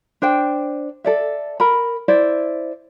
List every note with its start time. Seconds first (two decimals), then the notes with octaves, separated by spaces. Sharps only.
0.22 D4 C5 G5
1.04 A4 D5 E5
1.60 A#4 B5
2.08 E4 C5 D5 E5